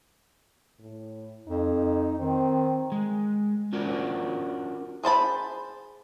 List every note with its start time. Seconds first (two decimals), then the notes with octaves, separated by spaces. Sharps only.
0.80 A2
1.48 F2 D#4
2.19 D#3 C4
2.92 G#3
3.73 C#4 D4 F4 F#4 A#4 D5
5.04 G#4 C5 A5 B5